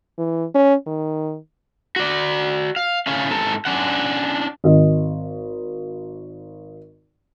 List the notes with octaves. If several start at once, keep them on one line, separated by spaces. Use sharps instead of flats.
E3
C#4
D#3
F#4 D5
F5
A3 C#4 F5
G#2 C4 A4 A5 A#5
C#4 D4 F#5
G#1 D#5